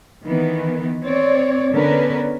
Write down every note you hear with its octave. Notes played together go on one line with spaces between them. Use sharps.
D#3 E3 B3
C4 C#5 D5
D3 B3 C#4 D4 A#4 B4